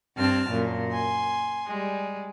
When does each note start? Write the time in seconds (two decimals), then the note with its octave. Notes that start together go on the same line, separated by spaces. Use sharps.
0.16 G2 C4 A5 F6
0.51 F#2 A#2
0.92 G#5 C6
1.67 G3 G#3